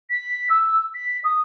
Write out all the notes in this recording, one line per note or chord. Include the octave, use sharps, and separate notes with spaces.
B6
E6
B6
D#6